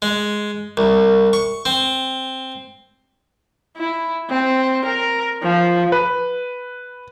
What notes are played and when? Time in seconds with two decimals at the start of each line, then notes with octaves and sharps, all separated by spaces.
0.02 G#3
0.77 C2
1.33 C#6
1.65 C4
3.77 E4
4.30 C4
4.85 A#4
5.43 F3
5.92 B4